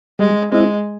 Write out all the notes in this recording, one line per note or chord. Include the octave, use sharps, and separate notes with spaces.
G3 G#3
G#3 C4 E4